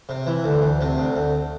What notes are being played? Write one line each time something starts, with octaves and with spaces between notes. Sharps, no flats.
C3
E3
D2
D2
C3
D2
D2